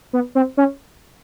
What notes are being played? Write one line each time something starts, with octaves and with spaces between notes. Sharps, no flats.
B3
C4
C#4